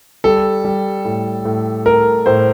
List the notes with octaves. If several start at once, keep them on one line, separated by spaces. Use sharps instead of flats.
G3 A4
G3
A2
A2
A2 A#4
A2 C5